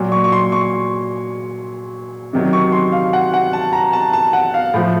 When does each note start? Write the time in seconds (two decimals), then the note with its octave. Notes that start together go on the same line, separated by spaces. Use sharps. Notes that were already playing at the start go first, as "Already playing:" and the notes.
Already playing: A#2 F#3
0.12 C#6
0.24 C#6
0.32 C6
0.52 C#6
2.33 C3 D#3 F#3
2.53 C#6
2.72 C6
2.92 F5
3.13 F#5
3.34 F#5
3.53 A5
3.73 A#5
3.93 A5
4.13 A5
4.33 F#5
4.54 F5
4.74 A2 F3